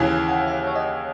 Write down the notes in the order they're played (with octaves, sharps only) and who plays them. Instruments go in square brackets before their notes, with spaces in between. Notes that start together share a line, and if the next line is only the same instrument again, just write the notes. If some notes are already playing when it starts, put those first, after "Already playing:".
Already playing: [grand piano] D#2 C#3 E3
[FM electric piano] G#5
F#5
E5
C#5
D#5